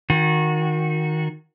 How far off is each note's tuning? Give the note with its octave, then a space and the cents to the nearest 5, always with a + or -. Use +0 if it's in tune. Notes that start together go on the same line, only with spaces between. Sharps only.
D#3 +0 F#4 -25